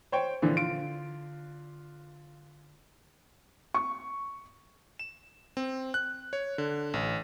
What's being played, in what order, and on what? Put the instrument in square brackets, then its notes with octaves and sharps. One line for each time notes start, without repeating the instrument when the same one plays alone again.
[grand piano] C5 C#5 G5
A#2 D3 E3 F3 D4
D3 F4 D7
[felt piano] C#6
[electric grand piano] E7
C4
F#6
C#5
D3
A1